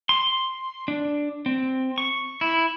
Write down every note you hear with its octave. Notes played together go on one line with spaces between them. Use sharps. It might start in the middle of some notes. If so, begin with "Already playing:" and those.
C6
D4
C4
C#6
E4